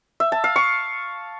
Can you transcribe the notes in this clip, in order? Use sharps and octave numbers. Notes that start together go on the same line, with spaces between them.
E5
A5
F5
C#6